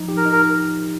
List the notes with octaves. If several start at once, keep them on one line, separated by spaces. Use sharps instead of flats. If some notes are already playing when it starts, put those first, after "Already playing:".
Already playing: F3 D#4
G4
A#4
D#4
A#4